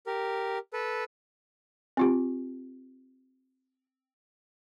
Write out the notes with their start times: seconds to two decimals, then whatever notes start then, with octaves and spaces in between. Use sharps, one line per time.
0.06 G4 A#4
0.73 A4 B4
1.97 C4 F4 G4